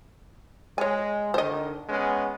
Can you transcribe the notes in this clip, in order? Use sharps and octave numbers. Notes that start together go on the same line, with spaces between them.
G#3 C#5 G#5
D3 D#3 C5 D#5
G#3 B3 C#4